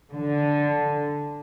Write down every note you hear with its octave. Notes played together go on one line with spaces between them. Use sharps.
D3